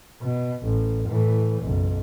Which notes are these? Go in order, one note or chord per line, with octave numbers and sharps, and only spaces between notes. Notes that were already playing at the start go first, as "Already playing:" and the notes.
B2
A1
A2 E3
F#1 B1